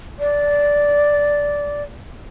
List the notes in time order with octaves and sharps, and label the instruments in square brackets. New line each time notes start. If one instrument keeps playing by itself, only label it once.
[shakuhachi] D5